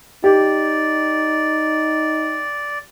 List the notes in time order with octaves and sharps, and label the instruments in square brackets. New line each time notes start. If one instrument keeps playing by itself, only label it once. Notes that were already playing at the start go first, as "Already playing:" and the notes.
[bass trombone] D#4 [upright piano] G4 [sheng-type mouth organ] D5